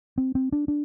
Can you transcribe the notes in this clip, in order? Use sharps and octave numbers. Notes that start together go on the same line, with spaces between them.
C4
C4
D4
D4